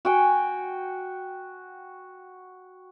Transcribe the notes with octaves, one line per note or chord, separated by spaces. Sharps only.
F#4 G5 G#5